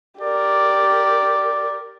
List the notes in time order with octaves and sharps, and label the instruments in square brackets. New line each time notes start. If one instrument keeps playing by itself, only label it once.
[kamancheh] G4 A#4 [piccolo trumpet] D5